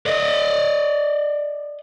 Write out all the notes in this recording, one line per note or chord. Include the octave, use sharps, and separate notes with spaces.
D5 D#5